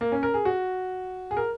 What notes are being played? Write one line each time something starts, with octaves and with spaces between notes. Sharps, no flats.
A#3
C#4
A#4
G#4
F#4
G#4
A#4